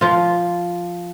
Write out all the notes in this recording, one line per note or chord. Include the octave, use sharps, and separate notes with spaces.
F3 F4